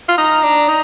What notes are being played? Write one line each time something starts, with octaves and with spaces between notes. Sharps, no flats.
F4
D#4 A#5
D4
D#4